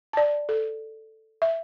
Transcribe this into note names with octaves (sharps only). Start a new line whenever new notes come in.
D5 A5
A4
E5